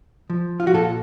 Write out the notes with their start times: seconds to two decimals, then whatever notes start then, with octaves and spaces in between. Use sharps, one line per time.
0.30 F3
0.60 F4
0.67 F#4
0.73 A#2 F4 A4